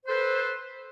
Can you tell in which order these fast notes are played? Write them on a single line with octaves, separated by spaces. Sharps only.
C5 A4 B4